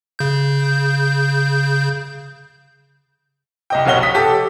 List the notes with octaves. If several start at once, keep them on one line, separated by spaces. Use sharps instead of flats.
C#3 G6
C2 D#5 G5
F1 B1 C#5 F#5 G7
D#6 B6
G4 A4